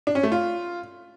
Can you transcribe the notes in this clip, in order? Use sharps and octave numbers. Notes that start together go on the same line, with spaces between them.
D4
C#4
A3
F4